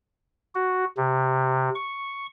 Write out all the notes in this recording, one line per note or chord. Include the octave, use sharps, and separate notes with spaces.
F#4
C3
C#6